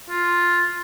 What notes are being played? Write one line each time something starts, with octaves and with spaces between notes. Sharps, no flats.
F4